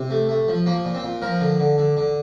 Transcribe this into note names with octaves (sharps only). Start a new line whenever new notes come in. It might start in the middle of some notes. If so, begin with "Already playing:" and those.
Already playing: C3
A3
A3
F3
F3 A#3
A#2
C4
A#2
F3 A#4
D3
D3
D3
D3